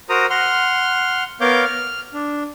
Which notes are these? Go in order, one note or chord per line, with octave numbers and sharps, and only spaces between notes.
F#4 A#4 C5 A#5 D#6
F#5 C6 F6
B3 A#4 C#5 F5 D6 G6
F6
D4